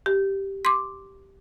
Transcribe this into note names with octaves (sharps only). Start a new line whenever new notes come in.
G4
C6 D6